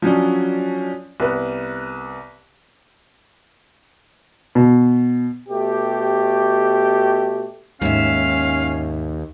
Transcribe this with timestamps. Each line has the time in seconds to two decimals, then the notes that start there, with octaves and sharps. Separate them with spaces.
0.02 F3 F#3 C#4 D4
1.20 C2 B3 B4
4.55 B2
5.48 B2 A3 G4
7.82 D#2 G#2 C#4 E5 F5